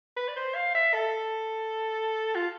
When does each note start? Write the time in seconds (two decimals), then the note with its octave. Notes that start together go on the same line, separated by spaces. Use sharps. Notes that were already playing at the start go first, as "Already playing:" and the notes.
0.17 B4
0.28 D5
0.36 C5
0.55 F5
0.75 E5
0.94 A4
2.35 F4